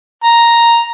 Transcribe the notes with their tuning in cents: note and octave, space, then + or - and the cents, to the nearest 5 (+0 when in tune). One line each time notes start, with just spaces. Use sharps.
A#5 +0